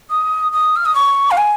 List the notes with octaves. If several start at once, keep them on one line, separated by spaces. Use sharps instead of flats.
D#6
D#6
F6
D#6
C#6
F5
G#5